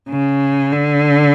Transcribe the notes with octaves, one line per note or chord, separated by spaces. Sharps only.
C#3
D3